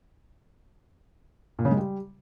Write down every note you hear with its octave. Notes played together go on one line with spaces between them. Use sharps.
A#2
C#3
G#3
G3